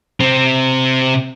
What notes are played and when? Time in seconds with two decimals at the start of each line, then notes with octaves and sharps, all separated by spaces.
0.20 C3 C4